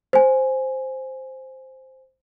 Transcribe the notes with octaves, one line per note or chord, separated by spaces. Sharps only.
C5 G#5